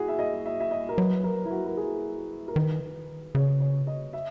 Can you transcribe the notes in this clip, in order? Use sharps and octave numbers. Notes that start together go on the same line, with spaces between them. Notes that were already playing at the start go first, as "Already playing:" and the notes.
Already playing: E4 F#4 G#4
E5
D#5
E5
E5
D#5
A#4
F#3 B4
A#4
E4
F#4
A#4
G#4
A#4
D#3 B4
C#3 C#5
C#5
D#5
E5